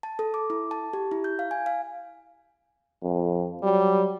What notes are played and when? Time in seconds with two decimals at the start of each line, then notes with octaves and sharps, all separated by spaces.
0.03 A5
0.19 A4
0.34 D6
0.50 E4
0.71 A5
0.93 G4
1.11 E4
1.24 G6
1.39 F5
1.51 G#5
1.66 F5
3.03 F2
3.63 F#3 G3